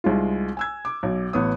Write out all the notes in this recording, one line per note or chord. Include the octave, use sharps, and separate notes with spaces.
C2 G#3 D#4 F4
G#5 E6 G#6
D6
B1
A1 B3 C#5 D#6